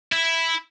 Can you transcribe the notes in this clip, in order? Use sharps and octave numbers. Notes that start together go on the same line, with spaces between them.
E4